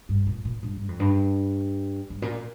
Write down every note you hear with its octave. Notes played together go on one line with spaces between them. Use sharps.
G2
A#2
A#2
G2
G2
F2
G2
G2
A#2